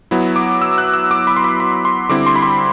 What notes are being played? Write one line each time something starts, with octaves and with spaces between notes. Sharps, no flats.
F#3 B3 E4
D6
E6
F#6
E6
D6
B5
C6
B5
B5
C6
D3 G3 C4 E4 D6
C6
B5
C6